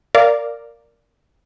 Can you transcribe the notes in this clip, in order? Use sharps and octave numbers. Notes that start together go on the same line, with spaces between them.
A#4 D5 F5